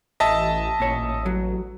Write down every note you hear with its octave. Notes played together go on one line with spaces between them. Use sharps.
A1 D#5 E5 A5
A1 A#2 C#5
A1
F#3